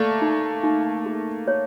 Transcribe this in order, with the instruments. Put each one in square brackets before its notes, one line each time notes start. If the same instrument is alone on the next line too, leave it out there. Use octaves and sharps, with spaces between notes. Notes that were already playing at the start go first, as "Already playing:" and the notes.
Already playing: [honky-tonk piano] A3 A#3 [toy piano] D5
[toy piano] D#4
D#4
G#4
C#5